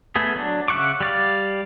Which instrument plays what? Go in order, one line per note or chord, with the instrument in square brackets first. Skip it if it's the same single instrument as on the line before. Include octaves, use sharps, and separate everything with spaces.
[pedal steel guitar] A3 B3 G#4
F#3 D4
C#3 E5 F#5 C#6 D6
G3 D5 F5